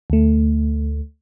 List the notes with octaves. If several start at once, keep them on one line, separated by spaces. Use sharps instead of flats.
D2 A3